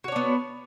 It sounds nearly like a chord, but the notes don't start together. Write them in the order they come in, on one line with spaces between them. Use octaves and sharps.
F#4 C#5 D4 B3